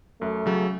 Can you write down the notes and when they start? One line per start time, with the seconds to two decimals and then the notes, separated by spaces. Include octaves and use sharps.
0.21 F#2 A3
0.46 C#3 F#3